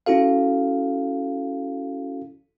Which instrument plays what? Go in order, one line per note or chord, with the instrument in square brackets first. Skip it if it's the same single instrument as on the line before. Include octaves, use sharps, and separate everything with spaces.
[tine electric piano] C#4 E4 F#4 A4 F5